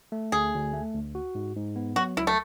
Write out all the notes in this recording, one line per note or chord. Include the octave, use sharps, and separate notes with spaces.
A3
D2 G#4
D2
A3
D2
F#4
G#2
G#2
B3
F#3 F#4
C#2 E4
A3